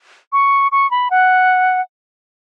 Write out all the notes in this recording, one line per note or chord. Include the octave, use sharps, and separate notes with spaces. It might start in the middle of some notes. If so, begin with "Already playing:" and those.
C#6
C#6
B5
F#5